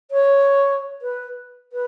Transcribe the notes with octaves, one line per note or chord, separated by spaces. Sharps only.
C#5
B4
B4